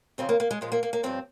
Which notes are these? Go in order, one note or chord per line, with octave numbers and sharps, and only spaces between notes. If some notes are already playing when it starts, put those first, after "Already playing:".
F2 C#3 F3 C4
A#3
A#3
G#3
A#2 F3 G#3
A#3
A#3
A#3
G2 F3 C4